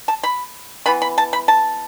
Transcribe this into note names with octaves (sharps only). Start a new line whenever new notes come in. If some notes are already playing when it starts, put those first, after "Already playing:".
A5
B5
E3 B3 B5
B5
A5
B5
A5